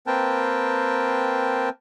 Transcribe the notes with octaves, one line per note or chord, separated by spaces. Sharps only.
A#3 C4 A#4 B4 G5 A5